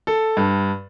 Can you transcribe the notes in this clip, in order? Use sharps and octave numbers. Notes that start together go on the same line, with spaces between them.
A4
G2